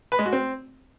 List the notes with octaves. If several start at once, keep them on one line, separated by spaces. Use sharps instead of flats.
B4
G#3
F#4
C4